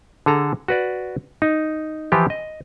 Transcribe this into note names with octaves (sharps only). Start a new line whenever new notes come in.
D3 G#4 A4 A#5
F#4 B4 D5
D#4
E3 F3 E4 F4 G4
D#5